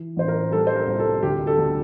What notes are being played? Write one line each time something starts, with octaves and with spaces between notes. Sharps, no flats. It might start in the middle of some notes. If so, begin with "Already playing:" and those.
Already playing: E3
A1 C5
A#4
G3 A4
C5
A#4
C2
A4
D2 G4
A4
D2